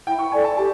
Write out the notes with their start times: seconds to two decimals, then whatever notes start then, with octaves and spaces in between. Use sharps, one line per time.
0.06 E4 G5
0.19 C#6
0.31 A4 D5 G#5
0.44 A5
0.57 G4 A5